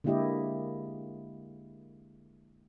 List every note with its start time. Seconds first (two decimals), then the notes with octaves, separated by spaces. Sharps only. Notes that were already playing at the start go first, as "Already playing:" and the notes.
0.04 D3 G#3 A#3 E4 G4 D#5